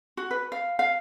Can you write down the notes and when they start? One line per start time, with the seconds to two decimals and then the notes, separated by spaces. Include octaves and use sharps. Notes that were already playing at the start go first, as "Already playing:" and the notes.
0.17 F#4
0.31 B4
0.52 F5
0.79 F5